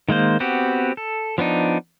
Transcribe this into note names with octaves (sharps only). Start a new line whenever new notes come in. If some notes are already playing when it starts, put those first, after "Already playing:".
D#3 G#3 A#3 C5
B3 C4 F#4 G4
A4
F3 B3 D4 D#4